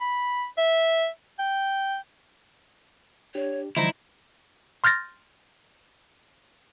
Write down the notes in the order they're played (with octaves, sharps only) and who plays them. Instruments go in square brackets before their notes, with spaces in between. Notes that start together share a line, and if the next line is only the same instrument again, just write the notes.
[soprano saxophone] B5
E5
G5
[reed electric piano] D4 G4 [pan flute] C#5
[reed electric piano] D3 E3 F3 [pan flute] G3 [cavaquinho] D#4 C5 A#5 [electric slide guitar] E4
[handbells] C6 F6 G6 A6 A#6